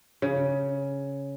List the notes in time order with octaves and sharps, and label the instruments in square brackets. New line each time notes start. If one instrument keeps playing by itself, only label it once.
[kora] C#3